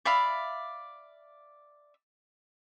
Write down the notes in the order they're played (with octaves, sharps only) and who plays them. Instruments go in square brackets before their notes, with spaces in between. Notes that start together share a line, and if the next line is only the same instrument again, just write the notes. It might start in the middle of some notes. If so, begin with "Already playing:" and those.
[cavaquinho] D5 E5 F5 B5